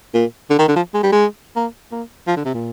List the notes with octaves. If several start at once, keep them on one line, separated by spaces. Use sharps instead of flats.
A#2
D3
D#3
D3
F3
G#3
G3
G#3
A#3
A#3
F3
D3
C3
A#2